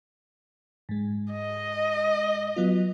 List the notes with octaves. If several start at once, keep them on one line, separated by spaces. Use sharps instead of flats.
G#2 G#3
D#5
F#3 B3 F4